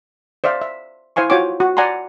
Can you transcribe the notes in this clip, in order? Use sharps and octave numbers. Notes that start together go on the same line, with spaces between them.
C5 D5 E5 F5
E5
E4 C5 F5 G#5 C#6
F4 F#4 C#5 G5 G#5 D6
F#4
D5 F#5 G#5 A#5 C6